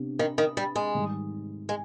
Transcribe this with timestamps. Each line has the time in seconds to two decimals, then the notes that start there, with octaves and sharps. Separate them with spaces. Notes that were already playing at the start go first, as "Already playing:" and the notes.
Already playing: C3 B3 D4 G4
0.19 D#3
0.38 D#3
0.57 G3
0.76 G#3
0.95 G#2 D#3 G3
1.69 G#3